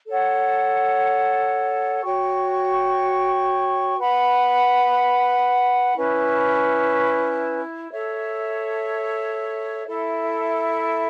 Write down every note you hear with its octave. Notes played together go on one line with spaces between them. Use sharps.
A4 C#5 F#5
F#4 C#5 G5 C#6
B4 F#5 B5
C#4 E4 B4
A4 C#5 E5
E4 A4 E5